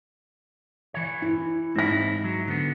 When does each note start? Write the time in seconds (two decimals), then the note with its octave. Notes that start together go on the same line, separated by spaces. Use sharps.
0.94 E3 C#5
1.22 E4
1.76 G#2 C4 E4 A#6
2.24 F#3
2.47 D3 B3